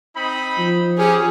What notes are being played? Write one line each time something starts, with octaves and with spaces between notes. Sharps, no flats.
C4 D#4 B5
F3
C#4 G4 G#4